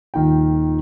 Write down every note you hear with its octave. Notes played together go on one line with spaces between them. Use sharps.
D#1 D#3 F3 G5